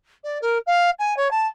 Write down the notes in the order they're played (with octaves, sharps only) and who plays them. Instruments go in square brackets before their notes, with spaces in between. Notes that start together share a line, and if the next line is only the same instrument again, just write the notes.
[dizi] D5
A#4
F5
G#5
C#5
A5